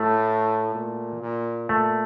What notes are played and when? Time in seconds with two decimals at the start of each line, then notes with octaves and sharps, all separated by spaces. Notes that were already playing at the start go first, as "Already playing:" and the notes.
Already playing: A2 A3
0.75 A#2
1.22 A#2
1.69 A#2 A3